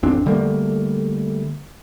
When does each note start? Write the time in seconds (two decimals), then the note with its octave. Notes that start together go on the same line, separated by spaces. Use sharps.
0.03 A1 F2 C4 D4
0.26 D3 G3 A3 A#3